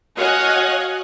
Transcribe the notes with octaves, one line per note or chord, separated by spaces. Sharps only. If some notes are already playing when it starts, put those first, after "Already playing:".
F#4 C#5 D#5 F5 F#5 G#5